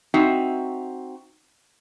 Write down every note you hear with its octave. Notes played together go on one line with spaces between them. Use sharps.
C4 D#4 F#4 E5